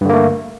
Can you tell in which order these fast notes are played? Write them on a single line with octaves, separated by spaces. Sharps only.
G2 D3 A#3 A3